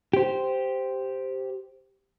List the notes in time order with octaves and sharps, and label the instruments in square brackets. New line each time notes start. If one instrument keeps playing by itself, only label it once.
[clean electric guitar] G4 C5